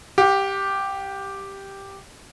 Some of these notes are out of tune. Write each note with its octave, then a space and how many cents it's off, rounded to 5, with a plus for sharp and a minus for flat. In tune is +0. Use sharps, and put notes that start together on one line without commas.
G4 +0 F#5 -45